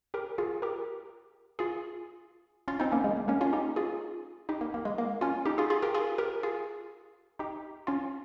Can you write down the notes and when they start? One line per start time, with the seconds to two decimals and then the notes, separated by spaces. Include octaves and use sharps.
0.14 G4 A#4
0.38 F4 G#4
0.62 G4 A#4
1.59 F4 G#4
2.68 C#4 F4
2.80 C4 D#4
2.92 A#3 C#4
3.04 G#3
3.17 A#3
3.28 A#3 C#4
3.41 C#4 F4
3.53 D#4 G4
3.76 F4 G#4
4.49 D#4 G4
4.61 A#3
4.74 A#3
4.85 G#3
4.98 A#3
5.21 C#4 F4
5.45 D#4 G4
5.58 F4 G#4
5.70 F4 G#4
5.82 G4 A#4
5.94 F4 G#4
6.18 G4 A#4
6.43 F4 G#4
7.39 D#4 G4
7.87 C#4 F4